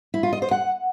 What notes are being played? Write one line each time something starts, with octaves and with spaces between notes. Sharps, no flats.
E4
F4
D#5
C5
F#5